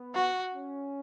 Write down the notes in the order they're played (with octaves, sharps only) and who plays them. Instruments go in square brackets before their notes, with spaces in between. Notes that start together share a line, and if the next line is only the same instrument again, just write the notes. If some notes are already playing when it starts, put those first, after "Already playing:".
Already playing: [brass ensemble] B3
[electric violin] F#4
[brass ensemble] C#4